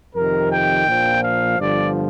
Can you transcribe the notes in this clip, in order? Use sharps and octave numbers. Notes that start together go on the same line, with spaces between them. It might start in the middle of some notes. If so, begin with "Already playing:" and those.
F2 C3 D#3 A#4
G5
A#1 A#2 F3
F5
G1 G2 D3 F3 D5